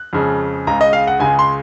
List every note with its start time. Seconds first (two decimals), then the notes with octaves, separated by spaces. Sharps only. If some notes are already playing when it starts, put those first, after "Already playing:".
Already playing: F#6
0.13 F2 C#3 G#3
0.67 C#2 C#3 G#3 A#5
0.81 D#5
0.93 F5
1.07 F#5
1.20 C#2 C#3 G#3 G#5
1.39 C6